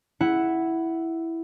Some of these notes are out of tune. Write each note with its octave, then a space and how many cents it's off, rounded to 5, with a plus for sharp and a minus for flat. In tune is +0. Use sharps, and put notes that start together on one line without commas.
E4 +0 F#5 +5